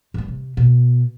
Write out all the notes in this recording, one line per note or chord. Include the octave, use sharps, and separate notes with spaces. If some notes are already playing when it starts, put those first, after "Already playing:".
G2 G3
C3
B2